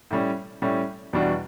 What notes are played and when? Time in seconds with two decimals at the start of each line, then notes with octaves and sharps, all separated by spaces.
0.11 A2 G3 C#4
0.62 A2 G3 C#4
1.13 E2 B2 G3 D4 F#4